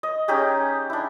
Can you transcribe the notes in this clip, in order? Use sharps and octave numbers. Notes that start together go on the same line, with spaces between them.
D#5
C#4 D#4 G4 G#4
D4 E4